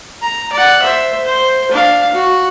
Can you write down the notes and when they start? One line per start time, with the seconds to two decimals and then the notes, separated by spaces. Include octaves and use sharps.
0.22 A#5
0.53 D5 F#5
0.82 C5 E5
1.25 C5
1.72 D4 F5
2.13 F#4